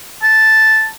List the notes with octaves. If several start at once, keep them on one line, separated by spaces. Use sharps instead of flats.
A5